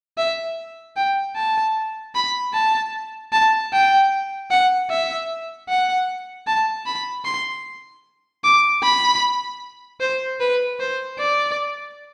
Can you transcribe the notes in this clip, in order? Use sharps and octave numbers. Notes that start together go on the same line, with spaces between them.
E5
G5
A5
B5
A5
A5
G5
F#5
E5
F#5
A5
B5
C6
D6
B5
C5
B4
C5
D5